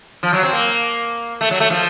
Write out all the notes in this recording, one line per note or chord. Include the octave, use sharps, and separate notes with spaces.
F3
F#3
C4
A#3
A3
F#3
A3
F3